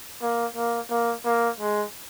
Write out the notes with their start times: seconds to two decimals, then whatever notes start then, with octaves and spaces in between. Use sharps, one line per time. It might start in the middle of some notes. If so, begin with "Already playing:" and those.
0.22 A#3
0.56 A#3
0.90 A#3
1.25 A#3
1.60 G#3